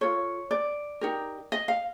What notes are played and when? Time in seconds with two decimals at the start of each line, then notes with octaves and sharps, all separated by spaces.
0.01 F4 A4 C#5
0.51 D5
1.01 D#4 G4 A#4
1.52 D#5
1.68 F5